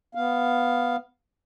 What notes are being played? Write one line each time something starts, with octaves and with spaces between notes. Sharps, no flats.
B3 F5